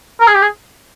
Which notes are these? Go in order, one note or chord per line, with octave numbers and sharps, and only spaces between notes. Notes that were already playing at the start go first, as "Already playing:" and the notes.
A#4
G#4
G4
G#4